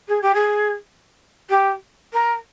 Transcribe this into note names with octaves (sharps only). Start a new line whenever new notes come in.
G#4
G4
G#4
G4
A#4